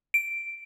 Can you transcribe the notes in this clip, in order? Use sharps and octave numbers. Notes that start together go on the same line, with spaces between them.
D7